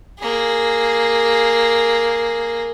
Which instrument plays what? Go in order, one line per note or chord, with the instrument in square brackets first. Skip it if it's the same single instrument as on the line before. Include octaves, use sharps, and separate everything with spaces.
[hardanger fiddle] A#3 G#4